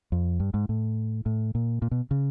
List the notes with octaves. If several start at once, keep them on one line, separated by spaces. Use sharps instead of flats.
F2
G2
G#2
A2
A2
A#2
A#2
B2
C#3